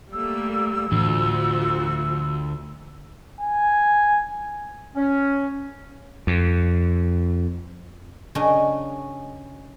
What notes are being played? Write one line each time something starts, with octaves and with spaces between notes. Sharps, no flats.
G3 A3 A#3 E6
D2 A2 E3 F3 D4 F#4
G#5
C#4
F2
F#2 C#3 F#3 C#4 D4 D#5